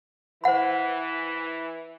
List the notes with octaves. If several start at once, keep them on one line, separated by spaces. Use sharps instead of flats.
E3 E4 C5 F#5 B5